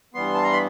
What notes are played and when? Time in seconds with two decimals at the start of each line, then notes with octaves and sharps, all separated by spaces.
0.14 G2 E3 G3 B3 C6
0.35 A5
0.44 A#5
0.53 B5